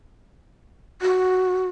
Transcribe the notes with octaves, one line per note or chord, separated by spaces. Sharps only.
F#4